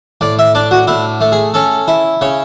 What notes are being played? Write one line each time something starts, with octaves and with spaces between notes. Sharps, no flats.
A2 D5
E5
D4 D5
F#4
A2 E4
A3
G#4
C#4 A4
E4
C#3 C#5